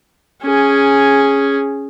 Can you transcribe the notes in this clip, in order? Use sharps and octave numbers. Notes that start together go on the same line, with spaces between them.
C#4 G#4